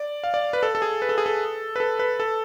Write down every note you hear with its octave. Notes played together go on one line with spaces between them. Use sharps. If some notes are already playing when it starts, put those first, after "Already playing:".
Already playing: D5
F5
D5
B4
A4
A4
G#4
B4
A4
G#4
A4
B4
A4
B4
A4